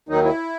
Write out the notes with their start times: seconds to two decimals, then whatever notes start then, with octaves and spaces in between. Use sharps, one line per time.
0.09 D#2 D#3 F#3 D#4
0.24 E4